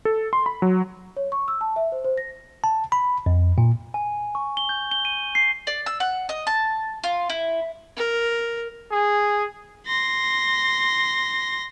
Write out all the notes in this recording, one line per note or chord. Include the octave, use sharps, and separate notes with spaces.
A4
C6
B5
F#3
C#5
C#6
E6
A5
E5
C5
C5
A#6
A5
B5
F2
A#2
G#5
C#6
G7
G6
G7
D#7
C7
D5
E6
F#5
D#5
A5
F4
E4
A#4
G#4
C6 A#6